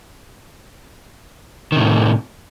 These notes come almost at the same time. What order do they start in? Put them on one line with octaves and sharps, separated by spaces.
D#3 C3 A2